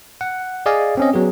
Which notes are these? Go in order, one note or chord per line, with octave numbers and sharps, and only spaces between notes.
F#5
G#4 D5 D#5 F5 G#5
C4 C#4 D#5
F#3 B3 G#4